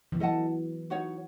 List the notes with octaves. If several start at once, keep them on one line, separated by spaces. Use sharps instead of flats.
E3
F#3 A4 D#5 F#5 A5
D#4 F#4 C#5 F#5